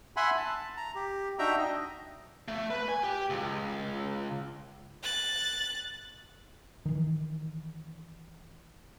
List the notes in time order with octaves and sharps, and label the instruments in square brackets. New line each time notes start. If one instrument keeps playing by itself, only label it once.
[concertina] E5 F#5 G#5 B5 C6
A5
A#5
G4
D4 D#4 F#4 E5 G5 A#5
D#5
[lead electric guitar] A3
B4
G#5
G4
C#2
[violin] F#6 A6
[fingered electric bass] D#3 E3